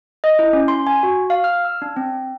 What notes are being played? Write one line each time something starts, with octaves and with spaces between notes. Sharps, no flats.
D#5
E4
C#4
C6
G#5
F#4
F5
F6
E6
D4
C4